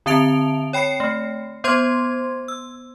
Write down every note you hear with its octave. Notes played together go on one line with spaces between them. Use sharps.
D3 C4 E5 A5 D7 F7
C#5 G5 B5 C7 C#7
A3
B3 C5 C6 G#6
E6